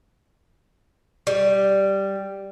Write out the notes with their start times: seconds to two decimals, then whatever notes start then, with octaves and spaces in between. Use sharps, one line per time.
1.27 G3